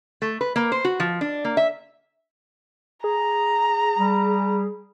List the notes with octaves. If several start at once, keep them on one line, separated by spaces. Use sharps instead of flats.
A3
B4
A#3
C5
F#4
F3
D4
A#3
E5
G#4 A#5
G3